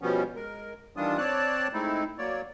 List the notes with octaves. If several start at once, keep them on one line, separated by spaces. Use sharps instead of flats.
B2 F3 G3 B3 C#4
G#3 A#4
D#3 E3 G3 D4 F4 D#6
C4 C#5 D5 A5 F#6
G#3 A3 C4 D#4 E4
F#3 A#3 C#5 D5